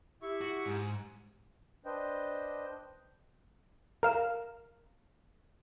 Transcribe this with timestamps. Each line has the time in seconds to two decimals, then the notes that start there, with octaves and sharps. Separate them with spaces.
0.22 E4 G4 E5 C#6
0.41 F#4
0.66 G#2
1.85 D4 B4 C5 D#5 G5
4.03 A#4 F5 E7